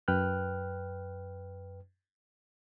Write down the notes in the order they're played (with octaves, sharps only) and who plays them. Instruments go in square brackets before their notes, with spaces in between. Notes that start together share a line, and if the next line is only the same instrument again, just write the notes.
[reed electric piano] F#2 B4 G5 F6 F#6